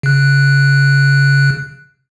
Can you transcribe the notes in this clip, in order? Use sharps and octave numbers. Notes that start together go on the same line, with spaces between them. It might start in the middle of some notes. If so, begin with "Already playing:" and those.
C#3 F#6